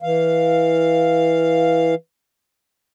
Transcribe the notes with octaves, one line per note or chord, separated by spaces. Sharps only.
E3 F5